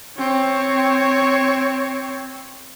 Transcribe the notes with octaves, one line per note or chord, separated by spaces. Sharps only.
C4 C#5